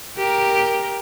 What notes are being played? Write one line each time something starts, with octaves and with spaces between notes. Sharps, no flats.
G4 A#4